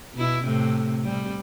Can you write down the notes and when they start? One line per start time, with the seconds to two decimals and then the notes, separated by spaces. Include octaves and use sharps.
0.14 B2 E4
0.43 A2 C3
1.04 C3 G3